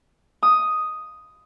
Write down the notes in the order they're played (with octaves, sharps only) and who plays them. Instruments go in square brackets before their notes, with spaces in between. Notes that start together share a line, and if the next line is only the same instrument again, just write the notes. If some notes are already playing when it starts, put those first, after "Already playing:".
[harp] D#6